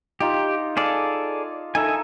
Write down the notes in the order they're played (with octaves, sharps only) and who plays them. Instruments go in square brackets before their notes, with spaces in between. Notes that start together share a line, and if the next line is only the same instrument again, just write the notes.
[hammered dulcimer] D#4 F4 [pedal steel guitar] G4
[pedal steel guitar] G#4 A4 D5 [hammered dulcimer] F5
[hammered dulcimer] D#4 A4 [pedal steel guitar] E5 G#5